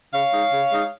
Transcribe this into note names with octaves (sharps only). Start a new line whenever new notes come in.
C#3 C#5 F5
G#3 D#4
C#3
G#3 D#4